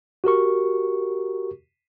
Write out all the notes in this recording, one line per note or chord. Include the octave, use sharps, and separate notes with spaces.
F#4 G4 A#4 C#6